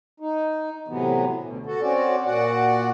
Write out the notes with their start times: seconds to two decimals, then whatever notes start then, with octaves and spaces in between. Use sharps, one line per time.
0.20 D#4
0.88 A2 C3 E3 F#3 B3
1.42 D2 B2
1.66 F#4 A4
1.82 C4 C#4 F#4 D5
2.25 A#2 F#4 D5 F#5